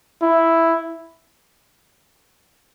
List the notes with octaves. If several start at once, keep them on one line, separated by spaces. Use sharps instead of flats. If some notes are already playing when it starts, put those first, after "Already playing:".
E4